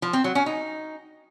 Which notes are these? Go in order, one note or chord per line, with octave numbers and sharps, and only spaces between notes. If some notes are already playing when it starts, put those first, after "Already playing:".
F3
C4
F#3
C#4
D#4